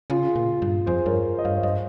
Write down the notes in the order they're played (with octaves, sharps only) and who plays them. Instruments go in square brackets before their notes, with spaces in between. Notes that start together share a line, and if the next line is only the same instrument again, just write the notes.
[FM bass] C#3 [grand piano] F4 G#4
[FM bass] A#2
G2
[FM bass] F2 [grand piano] G#4 C5
[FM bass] G2 [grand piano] A#4 C#5
[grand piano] D#5
[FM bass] G2 [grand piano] C#5 F5
[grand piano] C#5
[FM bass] G2 [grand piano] C5 D#5